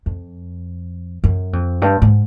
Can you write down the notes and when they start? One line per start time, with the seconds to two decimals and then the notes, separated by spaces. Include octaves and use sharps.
0.06 F2
1.24 F#2
1.53 F2
1.82 G2
2.02 G#2